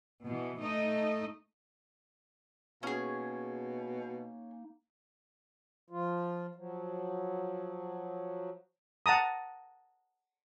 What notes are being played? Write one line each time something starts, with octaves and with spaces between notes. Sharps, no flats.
B2 E3
A3 D#4 D#5
B2 A#3 C#4 D#4 G#4
F3 F4
F3 F#3
F#5 A5 A#5 D#6